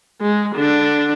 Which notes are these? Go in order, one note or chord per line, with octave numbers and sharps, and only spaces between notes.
G#3
D3 D4